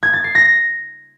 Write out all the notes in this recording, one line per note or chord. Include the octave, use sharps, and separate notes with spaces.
G#6
A6
C7
A#6